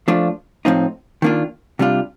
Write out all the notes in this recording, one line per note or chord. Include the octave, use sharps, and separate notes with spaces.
F3 A3 D4 F4
A2 F3 C4 D#4
D#3 A#3 D4 F4
C3 G3 D4 F4